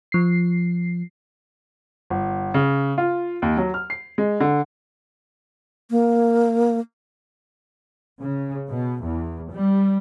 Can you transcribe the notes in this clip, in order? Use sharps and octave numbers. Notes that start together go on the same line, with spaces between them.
F3 C7
G1
C#3
F4
D#2
F#3
F6
C7
G#3
D3
A#3
C#3
B2
E2
G3